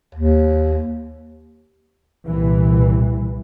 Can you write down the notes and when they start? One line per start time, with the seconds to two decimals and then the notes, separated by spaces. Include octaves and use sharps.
0.15 D#2
2.26 C2 A#2 E3